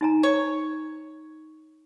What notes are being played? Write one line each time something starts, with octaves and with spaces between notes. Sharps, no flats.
D#4 G#5 A#5
C#5